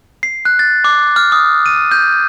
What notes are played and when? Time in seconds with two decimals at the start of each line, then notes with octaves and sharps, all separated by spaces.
0.23 C7
0.45 F#6
0.59 A6
0.84 D6
1.16 F6
1.32 D#6
1.66 D#7
1.91 G6